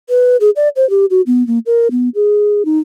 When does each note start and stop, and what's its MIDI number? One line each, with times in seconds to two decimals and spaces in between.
0.09 0.37 71
0.41 0.50 68
0.56 0.69 74
0.76 0.88 72
0.90 1.06 67
1.10 1.21 66
1.27 1.46 59
1.47 1.59 58
1.66 1.88 70
1.91 2.09 59
2.15 2.65 68
2.65 2.79 63